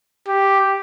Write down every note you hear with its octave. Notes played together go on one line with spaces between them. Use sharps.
G4